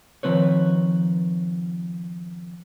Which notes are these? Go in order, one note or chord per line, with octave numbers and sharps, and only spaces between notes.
D#3 F3 C4 B4 C#5